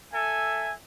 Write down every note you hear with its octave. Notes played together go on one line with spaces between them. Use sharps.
A4 E5 G#5